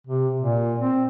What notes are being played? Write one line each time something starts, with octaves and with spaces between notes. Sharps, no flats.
C3
A#2
C4